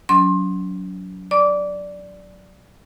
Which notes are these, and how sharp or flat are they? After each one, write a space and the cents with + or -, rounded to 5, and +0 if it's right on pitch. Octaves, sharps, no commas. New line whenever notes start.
F#3 +0 C#4 +40 C6 +25
D5 -5 D6 -20